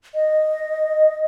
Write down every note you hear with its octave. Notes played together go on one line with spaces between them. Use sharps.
D#5